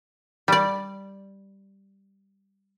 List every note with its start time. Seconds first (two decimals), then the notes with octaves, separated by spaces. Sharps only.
0.48 G3 D5